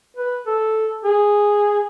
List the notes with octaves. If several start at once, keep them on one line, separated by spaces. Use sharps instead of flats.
B4
A4
G#4